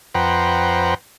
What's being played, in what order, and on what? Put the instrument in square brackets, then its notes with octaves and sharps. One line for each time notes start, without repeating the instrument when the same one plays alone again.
[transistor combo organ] F2 B4 C5 F#5 G5 A#5